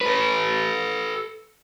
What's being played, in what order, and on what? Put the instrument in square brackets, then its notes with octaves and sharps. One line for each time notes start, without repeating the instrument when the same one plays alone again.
[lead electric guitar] A4 B4